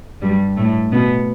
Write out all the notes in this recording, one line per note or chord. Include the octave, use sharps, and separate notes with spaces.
G2 G3
A2 A3
B2 B3